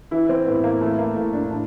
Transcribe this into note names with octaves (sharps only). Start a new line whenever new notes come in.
E3 E4
C4
A2 B3
A#3
E3 A3
A#3
A2 A#3
D4
A2 D4